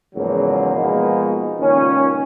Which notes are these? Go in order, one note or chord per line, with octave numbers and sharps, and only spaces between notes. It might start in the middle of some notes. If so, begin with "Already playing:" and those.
E2 G#2 C#3 F3 F#3 A#3
B2 F3 G#3 A#3 B3 D#4
C#2 A#2 D#3 C#4